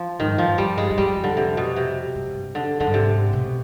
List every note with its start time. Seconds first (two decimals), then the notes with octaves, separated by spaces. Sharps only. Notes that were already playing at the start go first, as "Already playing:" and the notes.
Already playing: F3
0.19 G#2 D#3
0.27 G2
0.35 F2 F3
0.44 G2
0.58 G2 G3
0.78 G#3
0.90 G2
0.98 F2 G3
1.24 D3
1.37 C3
1.57 B2
1.76 C3
2.15 G2
2.23 G#2
2.30 G2
2.55 D3
2.80 F2 D3
2.87 G2
2.94 G#2 C3
3.33 B2